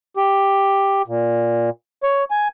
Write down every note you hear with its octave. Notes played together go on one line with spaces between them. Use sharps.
G4
A#2
C#5
G#5